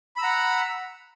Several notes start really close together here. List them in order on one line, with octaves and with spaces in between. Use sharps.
B5 E6 A#5 F#5